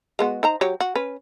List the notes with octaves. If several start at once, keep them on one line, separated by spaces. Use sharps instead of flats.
G#3 B3 F#4
D#4 C5 A#5
F#3 G4 C#5
F#4
C#4 B4